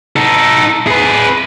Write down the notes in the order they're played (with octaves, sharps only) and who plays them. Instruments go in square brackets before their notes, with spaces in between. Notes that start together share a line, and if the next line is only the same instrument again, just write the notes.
[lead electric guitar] D#4 A4
G#4 B4